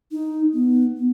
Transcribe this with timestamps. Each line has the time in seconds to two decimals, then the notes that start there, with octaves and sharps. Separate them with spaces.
0.12 D#4
0.54 B3
0.97 B3